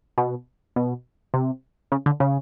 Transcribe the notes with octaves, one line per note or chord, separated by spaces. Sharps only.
B2
B2
C3
C#3
D3
C#3